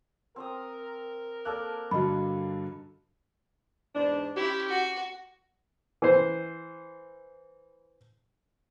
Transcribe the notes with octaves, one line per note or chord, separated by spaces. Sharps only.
C4 A#4 A#5 D#6
A#3 A4 D5 F#6
G2 D3 F#4 D#5 B5
E2 G#2 D4
C#4 E4 F4 G4
F#4
E3 C5